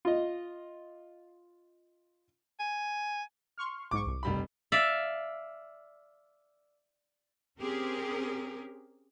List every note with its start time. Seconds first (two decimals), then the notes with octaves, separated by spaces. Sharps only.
0.05 F4 D#5
2.60 G#5
3.58 C6 C#6 F6
3.91 B1 G#2 C#6 D6
4.06 C2
4.23 F1 G3 B5
4.72 D5 E5 F5
7.59 C4 C#4 G4 G#4 A#4